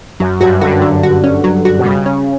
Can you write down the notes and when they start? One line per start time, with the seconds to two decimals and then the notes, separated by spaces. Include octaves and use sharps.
0.20 F#2 F#3
0.41 G2 F#4
0.61 D3 F#4
0.82 F#3
1.03 F#4
1.24 C#4
1.44 F#3
1.65 F#4
1.78 B2
1.85 C#3 G3
2.06 C#4